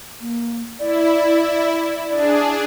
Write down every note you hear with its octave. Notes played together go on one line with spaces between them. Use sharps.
A#3
E4 D5
D4 G#4 D5